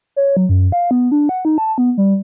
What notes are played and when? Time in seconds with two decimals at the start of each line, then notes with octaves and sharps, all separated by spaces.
0.16 C#5
0.37 F#3
0.49 F#2
0.72 F5
0.91 B3
1.12 D4
1.29 F#5
1.45 D#4
1.58 A5
1.78 B3
1.98 G3